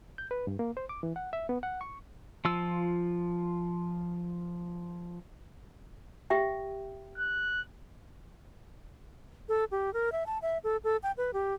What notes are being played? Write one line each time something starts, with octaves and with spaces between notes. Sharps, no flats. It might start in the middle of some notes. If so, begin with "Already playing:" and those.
G6
B4
G2
A#3
C5
D6
E3
F#5
E5
B3
F#5
C#6
F3 F4 E6
G4 E5 G5
F#6
A4
G4
A#4
E5
A5
E5
A4
A4
G5
B4
G4